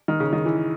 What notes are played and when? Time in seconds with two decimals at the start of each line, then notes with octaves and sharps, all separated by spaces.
0.08 D#3
0.20 C#3
0.33 D#3
0.46 E3